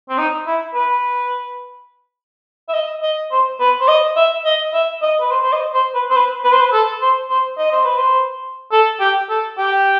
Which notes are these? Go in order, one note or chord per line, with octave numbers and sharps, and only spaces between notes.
C4
D#4
E4
B4
E5
D#5
D#5
C5
B4
C5
D#5
E5
D#5
E5
D#5
B4
C5
C5
D#5
C5
B4
C5
B4
B4
C5
B4
A4
C5
C5
D#5
C5
B4
C5
A4
G4
A4
G4